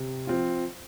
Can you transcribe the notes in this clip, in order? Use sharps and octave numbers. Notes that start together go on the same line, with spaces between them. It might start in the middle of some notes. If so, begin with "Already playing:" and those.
Already playing: C3
F3 C4 F4